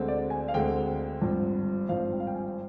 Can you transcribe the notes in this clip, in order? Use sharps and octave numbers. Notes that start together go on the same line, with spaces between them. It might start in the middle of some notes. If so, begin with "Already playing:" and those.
Already playing: D2 D3 G#3 C4
D5
G#5
F5
D2 D3 G#3 C4 G5
G#1 G2 F3 C4
G#1 G2 F3 C4 F5
G5
F5
G5
G#5